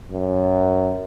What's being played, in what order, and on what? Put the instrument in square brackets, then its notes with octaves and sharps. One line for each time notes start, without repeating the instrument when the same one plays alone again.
[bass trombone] F#2